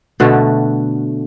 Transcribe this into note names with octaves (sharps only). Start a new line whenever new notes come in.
B2 D3 A3 F#4